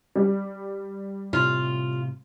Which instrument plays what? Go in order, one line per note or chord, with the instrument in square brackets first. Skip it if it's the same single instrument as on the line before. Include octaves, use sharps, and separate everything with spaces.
[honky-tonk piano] G3 G4
[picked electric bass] A2 C3 [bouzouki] F4